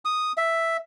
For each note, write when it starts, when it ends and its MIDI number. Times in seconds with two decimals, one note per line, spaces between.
0.05 0.32 87
0.37 0.77 76